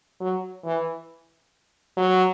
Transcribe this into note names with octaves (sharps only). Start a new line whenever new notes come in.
F#3
E3
F#3